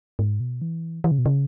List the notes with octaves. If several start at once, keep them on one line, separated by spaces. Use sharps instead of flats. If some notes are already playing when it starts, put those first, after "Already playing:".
G#2
B2
E3
E3
C#3
B2
C#3